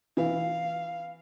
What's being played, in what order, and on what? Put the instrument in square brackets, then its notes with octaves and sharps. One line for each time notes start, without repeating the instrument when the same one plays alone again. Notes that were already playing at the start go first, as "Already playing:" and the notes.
[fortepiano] E3 [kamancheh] F5